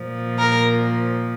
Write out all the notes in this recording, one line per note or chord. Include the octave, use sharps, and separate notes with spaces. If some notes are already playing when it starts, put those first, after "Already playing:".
Already playing: A#2 F3
A#4